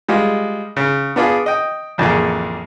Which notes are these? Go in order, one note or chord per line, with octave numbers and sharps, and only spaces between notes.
G3 G#3 F4
C#3
B3 D4 F4 G#4
D#5 G5
A1 F2 D3 A#3 G#4